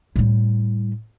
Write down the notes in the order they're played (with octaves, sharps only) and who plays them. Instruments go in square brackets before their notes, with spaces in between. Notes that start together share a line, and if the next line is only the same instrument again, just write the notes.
[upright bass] A2 G3